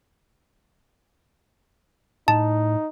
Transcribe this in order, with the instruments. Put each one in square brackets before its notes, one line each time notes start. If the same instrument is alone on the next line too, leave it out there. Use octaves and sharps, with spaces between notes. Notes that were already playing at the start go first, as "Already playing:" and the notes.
[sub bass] A2 [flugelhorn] D#4 [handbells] A5